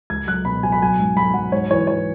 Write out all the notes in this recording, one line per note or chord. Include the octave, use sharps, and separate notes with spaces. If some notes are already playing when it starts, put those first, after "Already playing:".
C#2 G#6
F#3 F#6
B2 B5
F#3 G#5
B5
F#3 G#5
G#2
F#3 B5
F#3 F#5
G#2 C#5
E3 C#5
E3 C#5